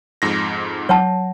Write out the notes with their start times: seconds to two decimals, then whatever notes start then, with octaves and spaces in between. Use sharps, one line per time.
0.22 F2 G#2 A#6
0.89 F#3 C#5 F#5 A5